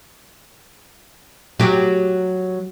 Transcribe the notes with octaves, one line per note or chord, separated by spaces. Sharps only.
F#3 G4